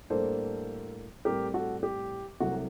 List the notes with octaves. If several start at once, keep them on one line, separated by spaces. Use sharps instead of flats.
A2 G3 A#3 D4 A4 C5
A2 G3 C4 G4 A#4
F#4 A4
G4
C2 C3 F#3 A3 C4 F#4